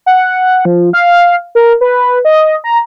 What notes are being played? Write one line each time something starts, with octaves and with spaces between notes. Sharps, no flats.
F#5
F3
F5
A#4
B4
D#5
A#5